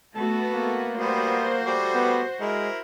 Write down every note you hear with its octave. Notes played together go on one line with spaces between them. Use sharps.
A3 B3 F#4 A4
A#3
G3 B3 F#4 C5
G3 A3 D5
B3
G#3 E4 A#4